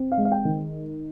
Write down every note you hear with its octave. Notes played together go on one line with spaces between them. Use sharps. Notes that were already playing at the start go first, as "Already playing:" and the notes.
Already playing: C4
F5
G#3
F5
G5
D#3